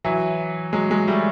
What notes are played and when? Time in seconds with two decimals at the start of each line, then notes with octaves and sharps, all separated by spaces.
0.04 E3 F#3
0.73 F#3 G#3
0.91 F#3 G#3
1.08 G3 A3